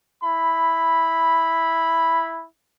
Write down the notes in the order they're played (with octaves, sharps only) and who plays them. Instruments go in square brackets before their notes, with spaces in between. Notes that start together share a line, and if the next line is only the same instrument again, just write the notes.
[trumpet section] E4 B5